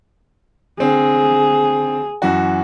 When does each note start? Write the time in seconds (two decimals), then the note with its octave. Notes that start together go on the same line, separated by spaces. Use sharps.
0.80 D3 C4 G#4
2.22 F#2 E3 F#4